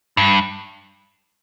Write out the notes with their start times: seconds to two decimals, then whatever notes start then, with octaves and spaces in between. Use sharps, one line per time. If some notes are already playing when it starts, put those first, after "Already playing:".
0.17 G2